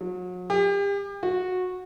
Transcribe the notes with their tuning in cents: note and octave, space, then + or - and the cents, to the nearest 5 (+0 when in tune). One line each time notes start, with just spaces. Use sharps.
F#3 -40
G4 +35
F#4 -15